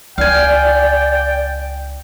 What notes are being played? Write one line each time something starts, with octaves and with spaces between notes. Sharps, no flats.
C#2 D5 F5 G5 G#5